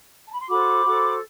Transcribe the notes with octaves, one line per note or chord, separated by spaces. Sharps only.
A5
B5
C6
F#4 A4 C5 B5 D6
F#4 A4 C5